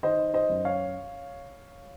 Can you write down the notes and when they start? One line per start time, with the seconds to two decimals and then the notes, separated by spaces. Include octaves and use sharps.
0.03 D#3 C5 D#5
0.34 C5 D#5
0.49 F#2
0.65 C#5 F5